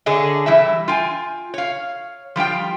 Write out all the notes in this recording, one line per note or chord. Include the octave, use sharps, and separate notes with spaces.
D3 D4 G#4 C#5 D#5
E3 G3 E4 E5
F4 G5 G#5
C#5 F5
F3 G3 F4 G5